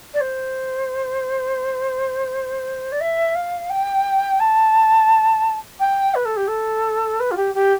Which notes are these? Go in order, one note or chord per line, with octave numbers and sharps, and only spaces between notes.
D5
C5
D5
E5
F5
G5
A5
G5
B4
A4
G4
A4
B4
F4
G4
G4